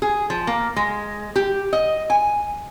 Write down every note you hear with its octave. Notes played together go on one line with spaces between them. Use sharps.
G#4
F3
A#3
G#3
G4
D#5
G#5